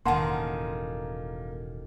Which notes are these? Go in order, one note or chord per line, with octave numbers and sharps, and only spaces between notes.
E1 F#2 A2 D#3 A#3 F#5 A5 C6